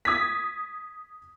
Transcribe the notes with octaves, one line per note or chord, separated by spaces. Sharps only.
D#6 G#6 A6 B6